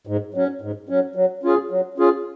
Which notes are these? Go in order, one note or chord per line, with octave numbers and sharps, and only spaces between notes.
G#2
F#3 C#4
G#2
F#3 C#4
F#3
C#4 F4 G#4
F#3
C#4 F4 G#4